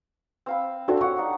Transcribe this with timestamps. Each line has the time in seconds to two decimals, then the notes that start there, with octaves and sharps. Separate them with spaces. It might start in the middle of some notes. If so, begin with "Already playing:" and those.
0.46 C4 F5 B5
0.88 C4 D4 F#4 A4
1.01 G4 C#5 F#5 C#6
1.16 D4 D#4 F#5